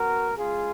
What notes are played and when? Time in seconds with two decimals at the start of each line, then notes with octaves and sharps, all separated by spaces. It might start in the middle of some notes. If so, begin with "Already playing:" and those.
Already playing: B2 F#3 F#4 A#4
0.36 C#3 G#3 F4 G#4